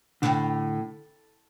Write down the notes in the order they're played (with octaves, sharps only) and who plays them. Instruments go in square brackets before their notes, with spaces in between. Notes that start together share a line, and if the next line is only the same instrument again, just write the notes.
[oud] A2 [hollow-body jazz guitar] D3